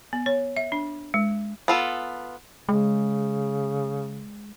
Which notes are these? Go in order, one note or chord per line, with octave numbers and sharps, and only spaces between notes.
B3
C#5
E5
D4
G#3
B3 F4 A4
C#3 G#3